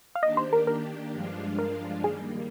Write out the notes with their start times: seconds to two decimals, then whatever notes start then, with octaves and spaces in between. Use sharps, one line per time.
0.15 F5
0.22 D#3 A#3 D4 G4 D#5
0.37 C5
0.53 A#4
0.67 A#4
1.13 G2 F3 G#3 D4 F4
1.59 A#4
2.04 D#2 D#3 G3 A#3 G#4